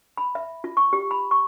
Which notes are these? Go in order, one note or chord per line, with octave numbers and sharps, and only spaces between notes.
B5
E5
F4
C#6
G4
B5
C#6